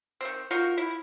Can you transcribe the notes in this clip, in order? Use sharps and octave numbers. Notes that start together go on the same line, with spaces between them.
D#3 C4
D#4 F4 F#4 A#4
E4